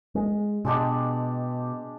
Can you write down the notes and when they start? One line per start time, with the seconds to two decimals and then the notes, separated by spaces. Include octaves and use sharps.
0.15 G#3
0.65 B2 G#3 D4 G4